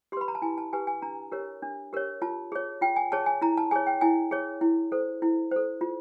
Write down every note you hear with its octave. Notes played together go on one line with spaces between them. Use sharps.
G4 B4 B5 C6
A#5
A5
E4 G#5
A5
G4 B4 G#5
G#5
D4 A#5
G4 A#4 C#5
D4
G4 A#4 C#5
F4 A5
G#4 C#5
F4 G5
G#5
G#4 C#5 A5
G#5
E4 A#5
A5
G#4 C#5 G#5
G5
E4 G#5
G#4 C#5
E4
A4 C5
E4
A4 C5
F4